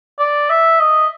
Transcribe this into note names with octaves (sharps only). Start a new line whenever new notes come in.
D5
E5
D#5